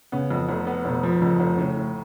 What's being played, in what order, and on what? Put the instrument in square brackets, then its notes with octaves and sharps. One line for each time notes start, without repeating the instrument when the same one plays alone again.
[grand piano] C#3 [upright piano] B3
[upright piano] F2
F1
B3
[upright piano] F1 [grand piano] B2
[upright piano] F3
[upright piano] F2 [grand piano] C#3
[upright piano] F1
[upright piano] A2 [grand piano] C#3
[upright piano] A2